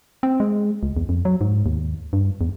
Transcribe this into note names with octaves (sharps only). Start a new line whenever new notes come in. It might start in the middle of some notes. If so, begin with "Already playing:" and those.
C4
G#3
C#2
E2
F2
F#3
G#2
D#2
G2
E2